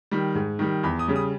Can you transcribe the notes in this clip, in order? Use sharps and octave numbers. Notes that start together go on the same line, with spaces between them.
D#3 G3
G#2
D#3 G3
E2 B5
D#6
C#3 G3
D#6